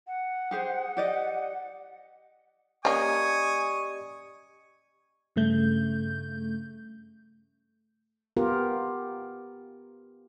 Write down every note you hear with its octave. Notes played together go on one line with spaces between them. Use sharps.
F#5
G4 G#4 C5
G4 D5 D#5
A#3 C#4 G4 D5 D#5 G#5 C#6 D#6
G2 C#3 A3 G6
B3 F4 G4 A#4